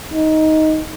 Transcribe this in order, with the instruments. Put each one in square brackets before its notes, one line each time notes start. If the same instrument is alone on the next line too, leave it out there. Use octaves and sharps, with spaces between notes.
[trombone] D#4